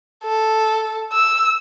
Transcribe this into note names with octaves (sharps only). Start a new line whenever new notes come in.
A4
E6